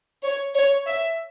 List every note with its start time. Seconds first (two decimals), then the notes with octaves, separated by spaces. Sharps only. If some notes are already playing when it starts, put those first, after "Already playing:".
0.23 C#5
0.55 C#5
0.87 E5